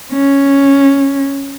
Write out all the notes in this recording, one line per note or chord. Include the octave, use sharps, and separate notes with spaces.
C#4